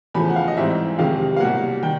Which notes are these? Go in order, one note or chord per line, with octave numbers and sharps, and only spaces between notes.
E2 C#3 F3 A3 B5
F#5
F5
D#5
G#2 E3 G3 C4 E5
F2 C3 D#3 G#3 F5
F5
C2 B2 F#3 A#3 F#5
D#3 G3 G5